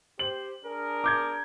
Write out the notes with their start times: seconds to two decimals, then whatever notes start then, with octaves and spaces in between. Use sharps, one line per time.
0.19 G4 C5 F#7
0.65 D4 G#4 A#4
1.04 D6 G6 G#6